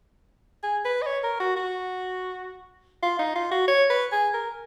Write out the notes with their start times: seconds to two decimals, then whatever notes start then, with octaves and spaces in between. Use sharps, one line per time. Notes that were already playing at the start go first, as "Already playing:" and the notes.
0.63 G#4
0.85 B4
1.02 D#5
1.07 C#5
1.24 A#4
1.40 F#4
1.56 F#4
3.03 F4
3.19 D#4
3.35 F4
3.52 F#4
3.68 C#5
3.90 B4
4.12 G#4
4.34 A#4